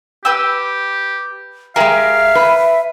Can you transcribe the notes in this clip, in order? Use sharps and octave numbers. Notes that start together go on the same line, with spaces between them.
G4 B4 G5 E6
G#3 G4 G#4 A#4 E5 F5
B4